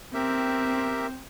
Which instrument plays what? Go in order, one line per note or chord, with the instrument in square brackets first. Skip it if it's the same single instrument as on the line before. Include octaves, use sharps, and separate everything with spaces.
[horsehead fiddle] C4 [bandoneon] G4 A#4 E5